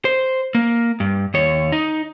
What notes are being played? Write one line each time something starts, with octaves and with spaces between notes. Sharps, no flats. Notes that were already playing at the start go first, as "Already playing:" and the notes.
C5
A#3
G2
D#2 C#5
D#4